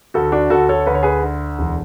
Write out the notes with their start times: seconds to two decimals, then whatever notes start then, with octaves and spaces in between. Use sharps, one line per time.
0.14 D2 F#4 A4
0.32 D4 F#4
0.50 D2 F#4 A4
0.69 A4 C#5
0.86 D2 B4
0.95 C#5
1.03 G#4 B4
1.22 D3
1.59 E1